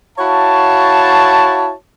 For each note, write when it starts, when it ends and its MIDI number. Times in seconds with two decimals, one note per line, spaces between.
0.19 1.73 64
0.19 1.73 66
0.19 1.73 73
0.19 1.73 77
0.19 1.73 81